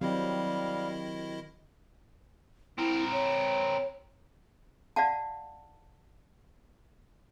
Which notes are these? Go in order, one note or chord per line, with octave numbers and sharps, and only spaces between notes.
D#3 F#3 G3 C4 E4 G4 D#5 F5
C4 E4 A#4
C#5
D5 F5 F#5 A5